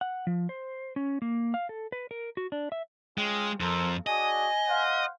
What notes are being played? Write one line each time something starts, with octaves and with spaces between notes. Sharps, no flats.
F#5
F3
C5
C#4
A#3
F5
A4
B4
A#4
F#4
D4
E5
G#3 C#4 F4 G5
F2 A4 A#4 C5
D4 F#4 G#4 D#5 G#5
C5 F5 F#5